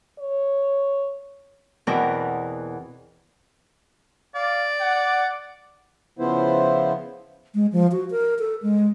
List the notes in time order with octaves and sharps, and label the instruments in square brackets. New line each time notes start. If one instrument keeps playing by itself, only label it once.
[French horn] C#5
[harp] E2 B2 C4 A#4 D6
[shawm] D5 [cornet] F5
[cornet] F#5
[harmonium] C#3 F3 B3 E4 C5
[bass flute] G#3
F3
F#4
A#4
A4
G#3